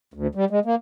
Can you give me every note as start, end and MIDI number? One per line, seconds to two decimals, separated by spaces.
0.14 0.27 38
0.35 0.45 55
0.50 0.59 56
0.65 0.75 58